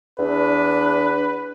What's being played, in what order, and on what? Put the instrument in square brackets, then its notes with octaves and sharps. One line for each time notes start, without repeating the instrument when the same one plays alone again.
[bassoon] E2 [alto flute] D4 [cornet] B4